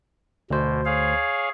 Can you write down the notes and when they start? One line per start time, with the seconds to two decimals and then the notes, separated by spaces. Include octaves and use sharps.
0.51 D2 B2 C5
0.86 G#4 C#5 F5